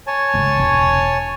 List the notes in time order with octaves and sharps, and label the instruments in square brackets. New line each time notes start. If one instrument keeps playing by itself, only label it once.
[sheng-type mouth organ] C#5 G#5 A5
[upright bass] G1 C#2
E1